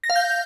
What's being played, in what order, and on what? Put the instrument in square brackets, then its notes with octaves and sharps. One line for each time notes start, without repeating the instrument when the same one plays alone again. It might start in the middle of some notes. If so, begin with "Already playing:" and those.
[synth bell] A#6
F5
G6